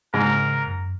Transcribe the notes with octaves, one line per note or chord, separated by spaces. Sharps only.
G#2 C#3 A#4
F#2